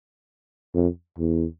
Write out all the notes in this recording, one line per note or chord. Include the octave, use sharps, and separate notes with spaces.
F2
E2